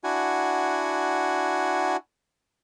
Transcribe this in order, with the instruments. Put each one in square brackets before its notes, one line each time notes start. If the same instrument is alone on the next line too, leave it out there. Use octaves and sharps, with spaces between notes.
[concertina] D4 E4 F#4 F#5 G#5